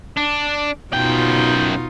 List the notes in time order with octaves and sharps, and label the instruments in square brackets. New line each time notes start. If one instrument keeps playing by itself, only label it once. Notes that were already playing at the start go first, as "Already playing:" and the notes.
[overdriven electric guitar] D4
[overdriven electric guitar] F#2 G5 [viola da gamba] B2 D#4 F4